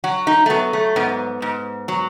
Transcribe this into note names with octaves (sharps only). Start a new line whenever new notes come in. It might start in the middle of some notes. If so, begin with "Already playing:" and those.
F#3 F#4
D#4
A3
F#3 B3
A3
G#2 B3
G#2
F#3